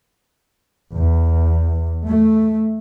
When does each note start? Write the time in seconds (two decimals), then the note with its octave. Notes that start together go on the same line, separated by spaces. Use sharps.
0.92 E2
2.08 A3